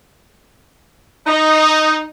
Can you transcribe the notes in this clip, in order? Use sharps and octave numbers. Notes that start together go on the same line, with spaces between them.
D#4